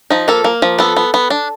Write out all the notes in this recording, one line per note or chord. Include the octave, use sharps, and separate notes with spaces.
F3 D#4
A#3 A4
A#3
F3
B3 A4
B3
B3
D4